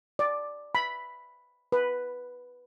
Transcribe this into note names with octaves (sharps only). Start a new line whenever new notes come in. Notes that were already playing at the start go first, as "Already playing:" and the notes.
D5
B5
B4